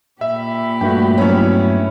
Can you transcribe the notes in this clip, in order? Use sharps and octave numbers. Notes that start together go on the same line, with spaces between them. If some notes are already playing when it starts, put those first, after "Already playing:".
A#2 G4 E5 B5
G2 A3 F#4 G5
F#3 B3 C#4 E4 C#5